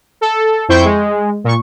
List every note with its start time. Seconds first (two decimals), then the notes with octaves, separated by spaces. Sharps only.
0.21 A4
0.68 F2 E4 C5 G5 C#6 G6
0.85 G#3
1.44 A#2 C#6